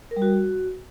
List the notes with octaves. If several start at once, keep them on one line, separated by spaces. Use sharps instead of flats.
A#4
G3
F#4